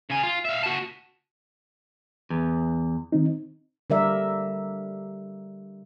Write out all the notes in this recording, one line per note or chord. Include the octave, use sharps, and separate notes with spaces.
C#3 G#5
F4
E5 F5
F#4 A5
E2
D#3 C4 D#4
D3 G3 A#4 D5 E5